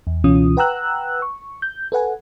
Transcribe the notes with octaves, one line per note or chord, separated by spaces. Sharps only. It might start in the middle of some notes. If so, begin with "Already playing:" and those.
E2
C#2 B2 E3 C#4 F4 D#6
B4 F#5 G5 A#5 E6 F#6
C#6
G6
A4 B4 F#5 G#5